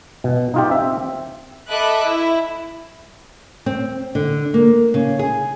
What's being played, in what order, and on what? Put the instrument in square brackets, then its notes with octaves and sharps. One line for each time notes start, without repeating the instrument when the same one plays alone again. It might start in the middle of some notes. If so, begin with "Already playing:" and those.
[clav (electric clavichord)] B2
D#4 F4 G4
C4 E5
[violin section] A4 D#5 E5 B5 D6 F#6
E4
[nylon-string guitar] C4
D3
A#3
C#3
G#4